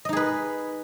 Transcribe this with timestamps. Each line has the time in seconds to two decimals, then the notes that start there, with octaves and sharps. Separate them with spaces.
0.05 D#5
0.09 D#4
0.13 G#4
0.17 B4